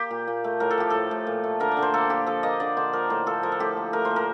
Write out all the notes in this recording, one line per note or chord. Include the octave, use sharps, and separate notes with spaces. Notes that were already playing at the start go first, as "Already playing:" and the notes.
Already playing: A#3 G4
A#2
A#2
A3
A2 A#4
A4
F3 G4
A2 A4
A2
A#2
A3
D3 A#4
D5
D3
C5
A#3 A4
A#2 G4
F3 A4
A#3 D#5
D3 D5
D3 C5
F3 A#4
A2 C5
F3 A4
F3 A#4
A4
A2 G4
A#3
A3 A#4
C5
A#2
A#4